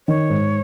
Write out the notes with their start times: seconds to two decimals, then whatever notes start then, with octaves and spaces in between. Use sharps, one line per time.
0.07 D#3 C#5
0.30 G#2